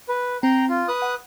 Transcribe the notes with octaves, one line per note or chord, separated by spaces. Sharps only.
B4
C4 G5 A#5
F4
B4 D#6 F#6
F#5